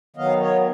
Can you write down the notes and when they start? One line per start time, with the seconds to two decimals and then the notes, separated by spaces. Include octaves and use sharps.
0.16 D#3 F#3 B3 D#5 F5
0.40 C#5 D#5